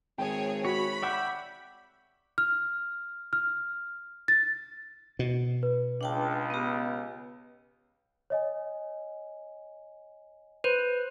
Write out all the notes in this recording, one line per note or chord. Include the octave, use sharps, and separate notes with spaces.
G#1 G#4 C#5 G5
F#4 C#5 B5
D5 E5 F#5 G5
F6
F6
A6
B2
B4
C#2 D4 G5 A5
B3 G4
C#5 D#5 G#5
B4 C5 D#7